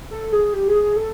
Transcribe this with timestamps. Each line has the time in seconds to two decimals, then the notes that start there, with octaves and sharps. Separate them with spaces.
0.11 A4
0.32 G#4
0.53 G4
0.68 G#4
0.82 G#4
0.96 A4